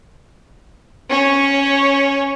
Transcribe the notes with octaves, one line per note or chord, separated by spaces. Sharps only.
C#4 C#5